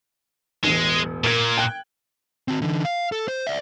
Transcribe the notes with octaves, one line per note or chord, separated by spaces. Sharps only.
E1 A1 G#3
A#2 A#4 G#6
G5 F#6
C4 F#4
D3 E3
F5
A4
C5
D5 E5